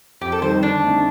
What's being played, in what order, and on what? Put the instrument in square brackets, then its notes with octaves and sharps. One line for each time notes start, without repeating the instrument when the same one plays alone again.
[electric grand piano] F2 [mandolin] G4
[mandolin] A4
[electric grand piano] D#3 G3 C4 D#4 [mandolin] C5
[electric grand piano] D3 [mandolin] D4
[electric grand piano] A3 C4 D#4